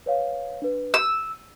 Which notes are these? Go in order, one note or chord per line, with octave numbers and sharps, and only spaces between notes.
B4 C#5 F5
D4 B4
E6 D#7